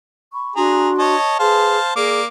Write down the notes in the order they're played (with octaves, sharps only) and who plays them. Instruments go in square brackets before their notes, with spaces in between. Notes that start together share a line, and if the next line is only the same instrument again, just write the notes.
[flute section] B5 C#6
[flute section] D4 F#4 C6 [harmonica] G#4 A#5
[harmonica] C#5 D#5 A5
[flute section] G#4 B4 [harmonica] C5 F5 A5
[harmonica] A#3 D6 [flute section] G#4 D5